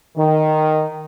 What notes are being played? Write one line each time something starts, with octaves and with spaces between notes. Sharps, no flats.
D#3